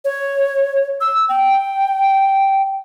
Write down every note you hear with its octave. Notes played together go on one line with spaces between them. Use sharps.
C#5
E6
G5